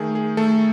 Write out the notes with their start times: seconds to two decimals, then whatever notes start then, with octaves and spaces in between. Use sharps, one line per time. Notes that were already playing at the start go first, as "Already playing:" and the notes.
Already playing: D#3 A3 G#4
0.15 G#4
0.37 A3 A4